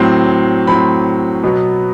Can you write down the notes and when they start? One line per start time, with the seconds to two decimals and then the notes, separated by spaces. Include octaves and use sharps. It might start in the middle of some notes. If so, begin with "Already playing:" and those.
Already playing: A2 F#3 C4 C6
0.67 A2 F#3 C4 B5
1.44 B2 F#3 B3